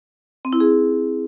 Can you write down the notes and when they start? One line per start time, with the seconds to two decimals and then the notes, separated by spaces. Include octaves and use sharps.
0.45 C4
0.53 E4
0.60 G#4